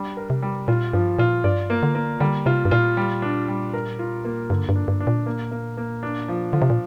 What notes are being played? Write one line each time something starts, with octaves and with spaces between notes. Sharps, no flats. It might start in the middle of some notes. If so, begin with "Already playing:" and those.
Already playing: G3 D4
A#4
C3
G3
A#2 F4
G2 F3
A#2 F4
G2 D5
A#3
D3
A#3
D3 G3
C3 F4
G2
A#2 F4
G3
D4
G3
A#4
F4
A#3
G2 D3
G2
D4
G2
D4
A#2
A#3
A#3
A#3
D4
F3
D3 F3
C3
A#2